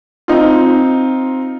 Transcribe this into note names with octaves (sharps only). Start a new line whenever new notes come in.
C4 D#4 F4